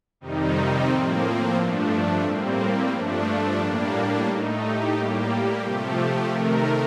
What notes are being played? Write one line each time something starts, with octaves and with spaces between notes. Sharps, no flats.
F2 C3 D#3 G3 D#4
C4
A2 F3 A#3
G2 F3 A3 D4
A2 G3 A#3 C4
G2 F3 A3 D4
D4
A2 G3 A#3 D4
A2 A3 D#4
G4
A2 G3 A#3
C3 F3 A3
C3 D#3 A3 A#4